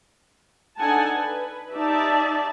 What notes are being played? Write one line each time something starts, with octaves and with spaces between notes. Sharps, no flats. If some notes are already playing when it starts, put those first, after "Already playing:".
D4 D#4 A4 F#5 G#5 A5
B4
D#4 G4 D5 E5 A5